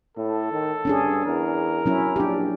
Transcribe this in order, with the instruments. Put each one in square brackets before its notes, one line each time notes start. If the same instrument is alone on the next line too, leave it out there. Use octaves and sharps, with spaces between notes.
[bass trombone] A2 [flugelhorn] A4
[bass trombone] D#3
[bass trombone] G2 [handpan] C#4 D4 G#4
[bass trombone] E2 [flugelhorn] A#4
[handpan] F#3 C#4 E4
[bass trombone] A#1 [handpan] D4 G4